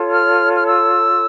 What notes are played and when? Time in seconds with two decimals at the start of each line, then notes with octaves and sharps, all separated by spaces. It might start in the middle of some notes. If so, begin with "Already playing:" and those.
Already playing: F4 A4 C#5
0.10 F6
0.55 F6
0.66 E6